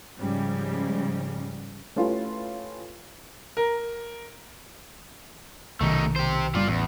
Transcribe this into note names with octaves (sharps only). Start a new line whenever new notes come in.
G#2 C#3 F3 G3
A3 C#4 E4 F4 G4 B4
A#4
B1 C3 D#3 A3 D#4
G4 C5
F#1 G3 F4 D5
A1 E2